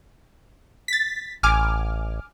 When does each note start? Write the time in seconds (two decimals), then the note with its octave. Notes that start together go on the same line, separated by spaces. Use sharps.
0.88 A6 B6
1.43 A1 G#5 D6 F6